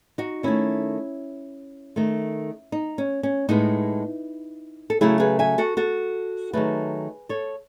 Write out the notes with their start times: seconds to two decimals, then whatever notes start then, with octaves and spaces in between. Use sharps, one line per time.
0.18 D#4 F#4
0.43 D#3 A3 C#4 E4
1.96 D#3 A3
2.72 D#4
2.98 C#4
3.23 C#4
3.49 A2 G#3 B3 D#4
4.90 A4
5.01 C#3 F#3 A3 E4 G#4
5.20 G#4 B4
5.39 E5 G#5
5.58 F#4 A4
5.77 F#4 A4
6.53 D#3 F#3 A3 G#4 B4
7.29 A4 C#5